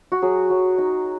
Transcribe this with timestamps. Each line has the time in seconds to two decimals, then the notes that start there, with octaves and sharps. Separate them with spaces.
0.12 F#4
0.22 F#3 G#4
0.50 F#3
0.78 D#4